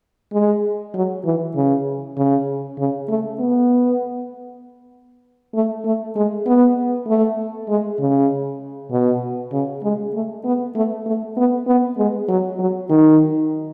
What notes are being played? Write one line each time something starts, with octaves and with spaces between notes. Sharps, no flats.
G#3
F#3
E3
C#3
C#3
C#3
A3
B3
A3
A3
G#3
B3
A3
G#3
C#3
B2
C#3
G#3
A3
B3
A3
A3
B3
B3
G#3
F#3
F#3
D#3